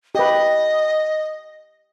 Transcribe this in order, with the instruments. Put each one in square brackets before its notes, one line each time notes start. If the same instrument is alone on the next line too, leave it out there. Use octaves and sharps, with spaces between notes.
[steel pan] G4 B4 [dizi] D#5